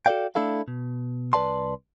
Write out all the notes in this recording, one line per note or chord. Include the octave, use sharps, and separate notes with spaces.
F#4 A4 A#4 D5 F5 G5
A3 D4 E4 A4 F5
B2
C2 B4 D5 A5 C6